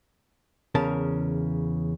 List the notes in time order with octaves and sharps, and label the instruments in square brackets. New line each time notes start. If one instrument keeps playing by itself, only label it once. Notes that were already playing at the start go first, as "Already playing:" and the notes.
[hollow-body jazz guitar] E2 C#3 A#4 A5